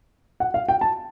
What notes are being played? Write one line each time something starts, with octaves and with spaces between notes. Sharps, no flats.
F#5
F5
G5
A5